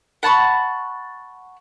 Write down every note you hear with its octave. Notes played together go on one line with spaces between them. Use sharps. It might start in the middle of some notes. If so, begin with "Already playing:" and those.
F#5 A5 B5 C#6